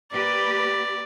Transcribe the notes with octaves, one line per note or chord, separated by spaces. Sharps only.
A#3 G4 B4 D5